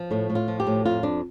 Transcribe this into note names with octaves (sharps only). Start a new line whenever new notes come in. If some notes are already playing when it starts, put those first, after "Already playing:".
Already playing: F3
A2 A3
A2
F4
F3
G4
A2
F2 F4
F2 D4